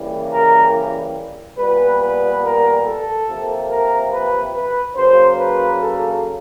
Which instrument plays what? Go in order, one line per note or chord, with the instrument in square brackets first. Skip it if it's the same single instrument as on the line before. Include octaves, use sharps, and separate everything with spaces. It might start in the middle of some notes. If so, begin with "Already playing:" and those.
Already playing: [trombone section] C#3 E3 G3 A#3
A#4
A#2 G3 B3 B4
B4
A#4
A4
C3 F3 A#3
A#4
B4
B4
C#3 F#3 A#3 C5
B4
A4